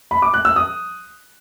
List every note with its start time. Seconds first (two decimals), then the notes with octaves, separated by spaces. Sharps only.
0.11 B5
0.22 D6
0.34 F#6
0.45 E6
0.56 D#6